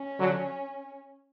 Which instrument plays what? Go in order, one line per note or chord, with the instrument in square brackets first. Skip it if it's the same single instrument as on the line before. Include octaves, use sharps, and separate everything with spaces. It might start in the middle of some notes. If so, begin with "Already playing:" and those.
Already playing: [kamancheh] C#4
[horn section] D3 F#3